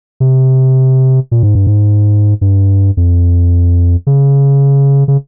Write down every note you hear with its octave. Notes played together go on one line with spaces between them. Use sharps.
C3
A#2
G#2
G2
G#2
G2
F2
C#3
C#3